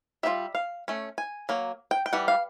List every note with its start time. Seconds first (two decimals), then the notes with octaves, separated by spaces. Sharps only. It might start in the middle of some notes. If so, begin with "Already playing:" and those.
0.23 G3 C4 F4 E5
0.55 F5
0.88 A3 C#4
1.18 G#5
1.49 F#3 A#3
1.91 G5
2.06 G5
2.13 E3 G3 F#5
2.28 F5